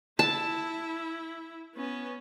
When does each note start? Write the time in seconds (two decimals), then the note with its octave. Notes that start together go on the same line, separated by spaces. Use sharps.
0.19 E4 A5
1.75 B3 C#4